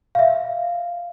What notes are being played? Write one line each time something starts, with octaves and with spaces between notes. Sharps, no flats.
E5 F5